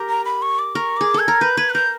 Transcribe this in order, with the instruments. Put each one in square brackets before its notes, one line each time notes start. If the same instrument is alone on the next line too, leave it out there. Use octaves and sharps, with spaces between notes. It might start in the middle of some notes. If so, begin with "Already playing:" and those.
Already playing: [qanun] G4 A#4
[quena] A#5
B5
C#6
D6
[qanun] A#4 [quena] C#6
[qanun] G#4 [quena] D6
[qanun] A4 [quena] G#6
[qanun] A#4
[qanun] B4 [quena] G6
[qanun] B4 [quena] G#6
[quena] F#6
[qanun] A#4 [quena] G6